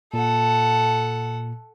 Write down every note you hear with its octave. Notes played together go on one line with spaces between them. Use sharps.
A#2 A4 F#5